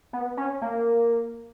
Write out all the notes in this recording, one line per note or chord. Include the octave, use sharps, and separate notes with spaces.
B3
C#4
A#3